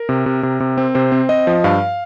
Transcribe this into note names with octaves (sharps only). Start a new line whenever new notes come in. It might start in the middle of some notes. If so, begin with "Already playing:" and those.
Already playing: A#4
C3
C3
C3
C3
C4
C3 C5
C4
C4 D#5
F3
G2 F5